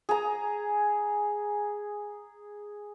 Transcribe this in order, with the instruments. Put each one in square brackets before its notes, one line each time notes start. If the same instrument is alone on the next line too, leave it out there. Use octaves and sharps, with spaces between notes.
[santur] G#4 A#5